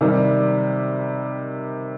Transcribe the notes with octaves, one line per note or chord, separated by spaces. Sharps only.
C3 D#3 G3